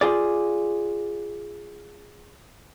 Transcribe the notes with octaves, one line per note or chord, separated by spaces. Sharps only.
F4 G#4 D5